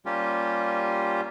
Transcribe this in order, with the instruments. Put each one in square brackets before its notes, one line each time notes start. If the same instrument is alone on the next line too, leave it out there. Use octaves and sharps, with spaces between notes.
[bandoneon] G3 A#3 C#4 F4 G4